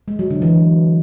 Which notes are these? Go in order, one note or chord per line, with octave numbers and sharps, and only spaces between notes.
G#3
F#3
D3
E3